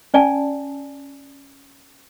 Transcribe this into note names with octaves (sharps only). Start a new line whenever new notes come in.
C#4 D5 G#5 A5